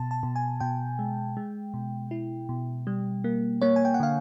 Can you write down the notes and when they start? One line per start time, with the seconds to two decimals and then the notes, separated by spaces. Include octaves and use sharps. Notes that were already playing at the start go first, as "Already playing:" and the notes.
Already playing: B2 A5
0.11 A5
0.23 B2
0.36 G#5
0.60 B2 G5
0.99 G#3
1.37 G#3
1.74 B2
2.11 E4
2.49 B2
2.87 G3
3.24 A#3
3.62 A#3 C#5
3.76 G#5
3.85 G5
3.94 F#5
4.00 D3 F5